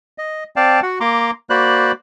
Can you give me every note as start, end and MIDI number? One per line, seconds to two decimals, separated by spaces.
0.18 0.44 75
0.56 0.80 60
0.56 0.80 74
0.56 0.80 77
0.56 0.80 79
0.56 0.80 81
0.83 0.99 66
0.83 0.99 78
1.00 1.31 58
1.00 1.31 82
1.00 1.31 84
1.00 1.31 86
1.50 1.92 58
1.50 1.92 66
1.50 1.92 72
1.50 1.92 74
1.50 1.92 83
1.50 1.92 90